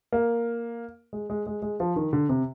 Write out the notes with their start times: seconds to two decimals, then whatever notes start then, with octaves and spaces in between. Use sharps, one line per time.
0.12 A#3
1.13 G#3
1.30 G#3
1.47 G#3
1.62 G#3
1.80 F3
1.96 D#3
2.13 D3
2.29 C3